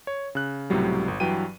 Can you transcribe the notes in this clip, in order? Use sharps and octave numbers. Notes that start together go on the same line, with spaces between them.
C#5
C#3 F#6
C#2 A2 C3 F#3 G3
G1
G2 E3 F#3 G5 D#7